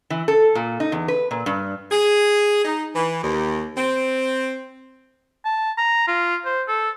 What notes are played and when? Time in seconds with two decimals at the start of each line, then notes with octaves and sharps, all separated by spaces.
0.10 E3
0.28 A4
0.55 A#2
0.80 D#4
0.92 E2
1.08 B4
1.31 A#2
1.46 G2
1.91 G#4
2.65 D#4
2.94 E3
3.22 D#2
3.76 C4
5.45 A5
5.78 A#5
6.07 F4
6.45 C5
6.67 A4